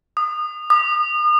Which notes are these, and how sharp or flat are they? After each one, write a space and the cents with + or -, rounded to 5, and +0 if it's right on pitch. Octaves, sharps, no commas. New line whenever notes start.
D#6 -25
D#6 -40